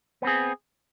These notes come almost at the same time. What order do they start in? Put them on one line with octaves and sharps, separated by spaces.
B3 C4 G#4